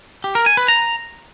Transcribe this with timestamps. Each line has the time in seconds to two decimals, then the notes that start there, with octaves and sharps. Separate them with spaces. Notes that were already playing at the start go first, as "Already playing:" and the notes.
0.24 G4
0.35 A#4
0.46 G#5
0.57 B4
0.68 A#5